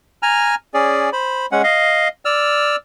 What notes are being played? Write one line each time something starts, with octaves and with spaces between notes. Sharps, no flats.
G#5 A#5 F6
C#4 G#4 D5
C5 B5
G#3 C#4 F#5
D#5 F5
D5 E6 F6